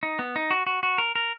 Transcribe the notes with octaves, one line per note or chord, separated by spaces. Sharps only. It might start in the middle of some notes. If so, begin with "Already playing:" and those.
D#4
B3
D#4
F#4
F#4
F#4
A#4
A#4